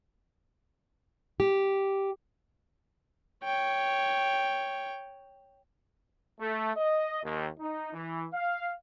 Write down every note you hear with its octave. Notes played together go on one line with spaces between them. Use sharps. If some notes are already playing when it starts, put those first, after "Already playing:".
G4
C#5 G5
A3
D#5
D#2
D#4
E3
F5